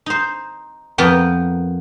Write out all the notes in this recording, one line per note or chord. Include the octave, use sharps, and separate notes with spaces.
D#4 C5
F2 B3 A#4 B4 G5